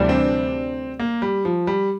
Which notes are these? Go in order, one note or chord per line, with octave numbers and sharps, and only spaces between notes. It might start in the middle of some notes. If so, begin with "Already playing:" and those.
Already playing: D2 C3 E3 G3 D4
C4
A#3
G3
F3
G3